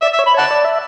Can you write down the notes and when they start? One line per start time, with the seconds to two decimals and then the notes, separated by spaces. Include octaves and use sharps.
0.02 D5 E5
0.14 E5
0.19 C#5
0.27 B5
0.34 C#5
0.38 F#5 A5
0.51 D5
0.65 E5